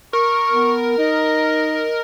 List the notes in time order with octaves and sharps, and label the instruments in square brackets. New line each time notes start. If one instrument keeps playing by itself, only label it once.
[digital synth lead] A#4 [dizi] C#6
[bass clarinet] B3
[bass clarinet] D#4 [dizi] D#5